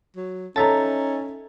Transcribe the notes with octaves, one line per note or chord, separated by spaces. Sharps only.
F#3
C#4 D#4 A4 C#5 E5 A5 A#5 A6